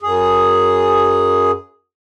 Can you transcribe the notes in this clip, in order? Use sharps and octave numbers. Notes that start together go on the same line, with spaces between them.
F#2 G#4